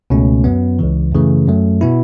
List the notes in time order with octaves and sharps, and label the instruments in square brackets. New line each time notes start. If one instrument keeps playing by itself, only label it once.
[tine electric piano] C#2 B2 A3 C#4
F#2 F#3 B3
C#2 C#3 E3
F#2 C#3 E3 A3
F#2 F#3 A3
B2 B3 E4